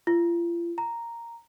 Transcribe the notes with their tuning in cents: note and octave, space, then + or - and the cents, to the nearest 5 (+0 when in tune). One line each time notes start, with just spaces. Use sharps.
F4 -40
A#5 -5